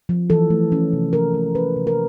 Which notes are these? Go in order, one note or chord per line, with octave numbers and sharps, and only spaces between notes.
F3
E3 A4
A3
C#4
C3
E3 A#4
A3
C#4 B4
C3
A#4